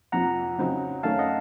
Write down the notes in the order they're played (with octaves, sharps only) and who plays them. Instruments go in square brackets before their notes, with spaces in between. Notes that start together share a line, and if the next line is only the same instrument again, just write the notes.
[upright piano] F2 C3 F3 [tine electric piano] F#5 A#5
[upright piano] C#3 F#3 C4 D#4
[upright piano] F#2 D#3 A3 C#4 [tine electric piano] F5 A5
[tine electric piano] D#5 F#5